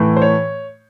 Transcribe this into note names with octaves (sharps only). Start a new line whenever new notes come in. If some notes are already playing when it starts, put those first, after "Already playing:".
Already playing: A2 E3 A3
C5
C#5